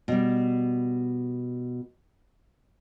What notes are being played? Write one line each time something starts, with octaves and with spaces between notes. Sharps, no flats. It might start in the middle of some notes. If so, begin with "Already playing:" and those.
B2 G3